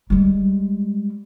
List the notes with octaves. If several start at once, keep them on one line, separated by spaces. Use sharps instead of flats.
G3 G#3